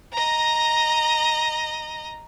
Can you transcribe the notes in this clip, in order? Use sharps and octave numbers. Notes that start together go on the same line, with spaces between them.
D#5 A#5